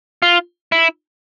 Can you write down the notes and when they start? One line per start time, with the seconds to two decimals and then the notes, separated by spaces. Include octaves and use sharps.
0.22 F4
0.72 E4